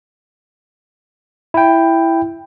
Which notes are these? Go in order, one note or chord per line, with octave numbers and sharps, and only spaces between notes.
E4 G5